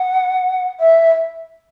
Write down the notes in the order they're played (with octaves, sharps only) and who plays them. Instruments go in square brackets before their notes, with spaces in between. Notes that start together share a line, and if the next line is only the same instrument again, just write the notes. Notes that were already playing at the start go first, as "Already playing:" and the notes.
Already playing: [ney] F#5
E5